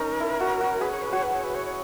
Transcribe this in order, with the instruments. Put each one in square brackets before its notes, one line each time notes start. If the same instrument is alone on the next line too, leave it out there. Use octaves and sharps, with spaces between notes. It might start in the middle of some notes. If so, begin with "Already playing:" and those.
Already playing: [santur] C#4 D#4 [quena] A#4
[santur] E4
F#4
F#4
[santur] G#4 [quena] B4
[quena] C#5
B4
[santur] F#4 [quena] C#5
[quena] B4
C#5
B4
C#5
C#5